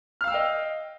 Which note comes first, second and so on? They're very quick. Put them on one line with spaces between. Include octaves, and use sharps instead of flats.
F6 F5 E6 G5 D#5